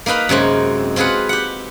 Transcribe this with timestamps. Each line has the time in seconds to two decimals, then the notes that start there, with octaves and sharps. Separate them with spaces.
0.06 A#3 D#4 B4 F5 B5
0.29 F#2 C3 G#3 C4
0.96 C4 F4 G#4 B4 F#5
1.29 G4 F#5